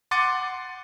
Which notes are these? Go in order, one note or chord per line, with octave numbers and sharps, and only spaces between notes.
F#5 C6 D6 A6 C#7 D#7